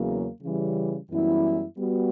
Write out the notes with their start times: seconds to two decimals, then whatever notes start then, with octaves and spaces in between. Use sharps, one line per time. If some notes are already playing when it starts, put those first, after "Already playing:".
Already playing: E2 C#3 F#3 A#3
0.42 C#3 E3 G3
1.11 F#2 E3 G3 B3 E4
1.78 G3 B3 F#4